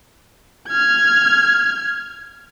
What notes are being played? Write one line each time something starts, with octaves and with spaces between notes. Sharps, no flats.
F6 G#6